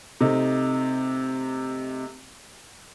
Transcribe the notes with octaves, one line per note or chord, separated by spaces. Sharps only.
C3 A3 D#4